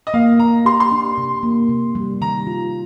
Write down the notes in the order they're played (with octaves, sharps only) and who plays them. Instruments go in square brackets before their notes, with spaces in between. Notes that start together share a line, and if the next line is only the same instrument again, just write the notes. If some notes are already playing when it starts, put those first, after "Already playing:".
[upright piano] D#5
[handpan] A#3 [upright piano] F5
[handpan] A#3 [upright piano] A#5
[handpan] G4 [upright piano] C6
[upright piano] C6
[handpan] D4
C3
A#3
C3
G3
[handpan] D#3 [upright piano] A#5
[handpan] F4